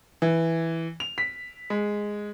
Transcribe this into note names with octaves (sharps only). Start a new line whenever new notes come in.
E3
F7
B6
G#3